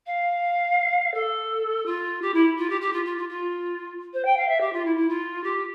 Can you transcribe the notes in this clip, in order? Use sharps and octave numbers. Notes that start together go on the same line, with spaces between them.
F5
A4
F4
G4
E4
F4
G4
G4
F4
F4
F4
F4
C5
G5
F5
E5
G4
F4
E4
E4
F4
G4